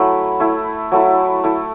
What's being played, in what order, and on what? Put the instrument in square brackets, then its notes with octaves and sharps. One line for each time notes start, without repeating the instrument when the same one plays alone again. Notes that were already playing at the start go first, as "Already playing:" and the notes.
Already playing: [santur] F#3 A3 E4 B5
A3 E4
F#3 A3 E4
A3 E4